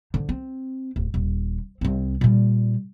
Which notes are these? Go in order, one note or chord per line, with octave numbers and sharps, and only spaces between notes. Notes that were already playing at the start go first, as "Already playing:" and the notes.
D3 F3
C4
D1
D#1
C2 C4
A#2 G3